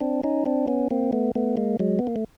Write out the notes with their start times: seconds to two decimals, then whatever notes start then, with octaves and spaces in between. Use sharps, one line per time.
0.01 C4 D4
0.23 C#4 D#4
0.46 C4 D4
0.68 B3 C#4
0.91 A#3 C4
1.13 A3 B3
1.35 A3 B3
1.57 G#3 A#3
1.79 F#3 G#3
1.99 B3
2.07 A#3
2.16 A3